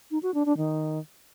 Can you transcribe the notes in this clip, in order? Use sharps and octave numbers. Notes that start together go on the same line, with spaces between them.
D#4
F#4
D4
D4
D#3